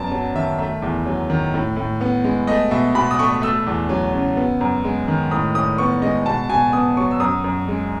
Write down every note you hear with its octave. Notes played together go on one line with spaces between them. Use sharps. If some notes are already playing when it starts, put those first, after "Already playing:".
Already playing: F#2 B3 A5
F#3
D#3 E5
A3 E5
E2
F#3
D#3
A2
A2
B3
G#3
A3 D#5
B2 E5
B2 B5
D#6
A3 C#6
A3 E6
E2
F#3
C#3
B3
F#2
G#3
D#3
A2 D#6
A2 D#6
B3 C#6
G#3 D#5
B2 A5
B2 G#5
B3 D#6
F#3 C#6
E6
F#2 D#6
F#2
G#3